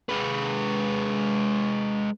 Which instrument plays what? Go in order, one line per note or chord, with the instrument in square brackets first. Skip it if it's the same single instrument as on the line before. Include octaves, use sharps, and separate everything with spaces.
[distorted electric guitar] G#3 B4